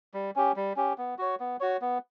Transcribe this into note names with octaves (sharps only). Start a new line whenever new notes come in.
G3
C#4 G4
G3
C#4 G4
B3
F#4 C#5
B3
F#4 C#5
B3